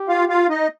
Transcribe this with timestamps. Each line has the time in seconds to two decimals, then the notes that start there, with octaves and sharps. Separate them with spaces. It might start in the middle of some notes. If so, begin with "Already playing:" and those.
Already playing: G4
0.09 F4 F5
0.29 F4 F5
0.49 D#4 D#5